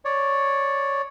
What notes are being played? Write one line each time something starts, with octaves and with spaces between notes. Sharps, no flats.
C#5 D5